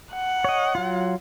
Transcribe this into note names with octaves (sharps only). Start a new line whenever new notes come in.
F#5
C#5 D#5
F#3 F4